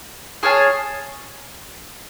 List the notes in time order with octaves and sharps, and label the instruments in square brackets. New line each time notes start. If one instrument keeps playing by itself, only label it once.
[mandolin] G#4 C#5 F5 A5